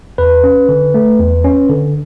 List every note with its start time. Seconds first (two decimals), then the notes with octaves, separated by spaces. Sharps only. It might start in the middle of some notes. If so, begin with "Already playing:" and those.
0.18 E2 B4
0.44 C#4
0.69 D3
0.94 A3
1.20 E2
1.44 C#4
1.69 D3